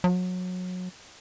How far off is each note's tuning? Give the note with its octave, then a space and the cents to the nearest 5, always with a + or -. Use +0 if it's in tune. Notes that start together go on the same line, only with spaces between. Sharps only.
F#3 -25